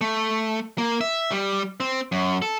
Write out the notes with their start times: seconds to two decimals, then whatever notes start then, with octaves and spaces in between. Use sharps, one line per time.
0.01 A3
0.78 A#3
1.01 E5
1.32 G3
1.80 C4
2.12 F#2
2.42 A4